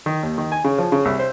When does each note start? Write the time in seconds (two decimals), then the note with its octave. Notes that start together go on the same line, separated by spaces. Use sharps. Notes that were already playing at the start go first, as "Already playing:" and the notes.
0.06 D#3
0.23 D#2
0.38 D#3
0.52 G#5
0.65 C#3
0.78 F3
0.92 C#3
1.05 C2
1.19 C5